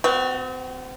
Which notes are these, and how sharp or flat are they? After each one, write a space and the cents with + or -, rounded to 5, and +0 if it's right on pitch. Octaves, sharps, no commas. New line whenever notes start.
C4 -35 F#4 +0